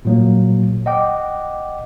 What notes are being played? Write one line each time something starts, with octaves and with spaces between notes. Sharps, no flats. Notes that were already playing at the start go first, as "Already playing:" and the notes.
A#2 F#3 A#3
D#5 F#5 G5 D6